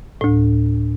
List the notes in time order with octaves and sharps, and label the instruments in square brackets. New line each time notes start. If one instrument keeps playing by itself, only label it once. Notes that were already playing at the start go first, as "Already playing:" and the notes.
[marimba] D2 A2